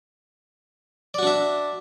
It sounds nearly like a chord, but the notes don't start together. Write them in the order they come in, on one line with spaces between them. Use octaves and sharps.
D5 F#4 D4 E5